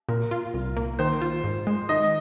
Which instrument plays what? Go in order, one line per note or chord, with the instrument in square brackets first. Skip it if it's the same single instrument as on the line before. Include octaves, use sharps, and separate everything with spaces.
[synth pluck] A#2 [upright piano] A#4
[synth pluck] F4
C2
A#3
[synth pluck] D#3 [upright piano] C5
[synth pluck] F4
G#2
G#3
[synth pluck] D#3 [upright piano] D#5